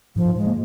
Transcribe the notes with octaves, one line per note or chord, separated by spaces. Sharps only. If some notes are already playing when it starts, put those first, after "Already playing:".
G#2 F3
G#2
G#2 G#3
A#3